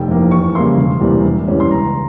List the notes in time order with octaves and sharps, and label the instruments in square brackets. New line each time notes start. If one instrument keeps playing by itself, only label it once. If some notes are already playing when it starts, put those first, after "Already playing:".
Already playing: [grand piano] F1 G5
F2 E3 A#3
E2 C#6
C#3 G3 A#3 E4 C6
E1
E2 C3 G3 A#3
E1
E2 E3 G3 C#4
C6
C#2 A#5